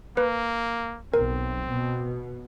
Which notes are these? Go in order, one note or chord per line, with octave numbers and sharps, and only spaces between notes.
A#3 B4
B1 C4 A#4
B2